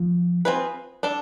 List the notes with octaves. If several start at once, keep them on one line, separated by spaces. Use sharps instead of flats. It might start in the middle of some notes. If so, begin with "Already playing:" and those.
Already playing: F3
C4 F4 G#4 B4
D4 A4 D5